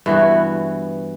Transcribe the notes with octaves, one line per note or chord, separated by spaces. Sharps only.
G2 E3 B3 F#4